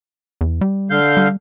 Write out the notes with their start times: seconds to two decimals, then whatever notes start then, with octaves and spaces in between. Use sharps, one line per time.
0.41 E2
0.61 G3
0.90 D3 F5 G6
1.17 G3